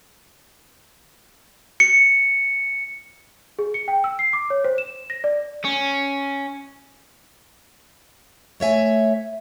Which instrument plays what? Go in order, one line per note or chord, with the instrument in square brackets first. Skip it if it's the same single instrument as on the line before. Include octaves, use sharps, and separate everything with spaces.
[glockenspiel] C#7
[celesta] G#4
C#7
G5
E6
C7
D6
C#5
C5
E7
A#6
D5
[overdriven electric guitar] C#4
[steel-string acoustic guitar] A3 C#5 E5 G#5